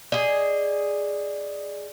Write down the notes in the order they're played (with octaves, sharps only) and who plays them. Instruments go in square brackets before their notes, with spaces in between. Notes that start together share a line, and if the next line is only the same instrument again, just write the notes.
[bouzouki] G#4 D#5 [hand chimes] D5